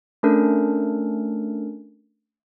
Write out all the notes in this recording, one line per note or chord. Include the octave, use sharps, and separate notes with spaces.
A3 C#4 D4 A4 A#4